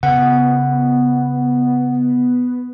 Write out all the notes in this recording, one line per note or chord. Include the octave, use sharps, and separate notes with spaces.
C#3 B3 F#5